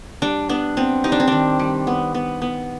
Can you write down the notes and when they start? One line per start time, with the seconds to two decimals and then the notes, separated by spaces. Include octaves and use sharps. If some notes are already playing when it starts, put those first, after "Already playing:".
0.22 G3 D4
0.49 B3 D4
0.77 B3 C4
1.04 G3 D#4
1.12 D4
1.20 C4
1.28 D#3 D4
1.59 G3
1.87 B3
2.14 B3
2.42 B3